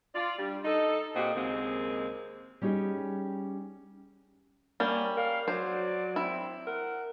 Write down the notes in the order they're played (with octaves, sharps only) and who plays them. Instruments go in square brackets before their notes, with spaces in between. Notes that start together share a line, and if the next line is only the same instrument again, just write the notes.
[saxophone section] F4 D5
G3 D4
D#4 A4
A#2 C4 F#4 G4 D#5
D#2 C#3 G#3 A#3 C4
[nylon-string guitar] G3 C#4 D#4 G4 G#4
[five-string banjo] G3 C#4 [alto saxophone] A#3
[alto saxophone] A#4 [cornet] F5
[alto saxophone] F#3 [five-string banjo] C5 [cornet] D5
[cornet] C4 [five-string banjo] E4
[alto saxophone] A#4 [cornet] F#5